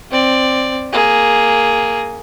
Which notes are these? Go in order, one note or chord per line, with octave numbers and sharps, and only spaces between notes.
C4 D5
A#3 G#4